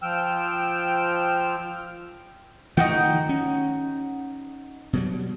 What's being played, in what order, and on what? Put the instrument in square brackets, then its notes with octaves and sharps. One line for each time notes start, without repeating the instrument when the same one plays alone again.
[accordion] F3 G5 E6 F6
[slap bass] D#3 F3 A3 [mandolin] D#4 F#4 G5
[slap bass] C#4
B2 F#3 G3